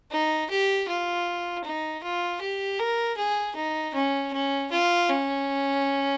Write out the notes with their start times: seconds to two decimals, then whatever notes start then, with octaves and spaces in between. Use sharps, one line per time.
0.11 D#4
0.50 G4
0.88 F4
1.64 D#4
2.03 F4
2.41 G4
2.79 A#4
3.17 G#4
3.56 D#4
3.94 C#4
4.32 C#4
4.71 F4
5.09 C#4